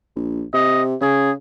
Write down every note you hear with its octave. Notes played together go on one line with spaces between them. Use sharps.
A#1
C3 D#5
C#3 G#4